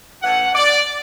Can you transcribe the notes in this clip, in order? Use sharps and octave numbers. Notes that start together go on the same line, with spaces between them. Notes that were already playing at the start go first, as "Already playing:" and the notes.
A2 E3 A3 C#4 F#5
D5